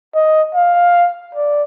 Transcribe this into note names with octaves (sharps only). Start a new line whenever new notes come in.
D#5
F5
D5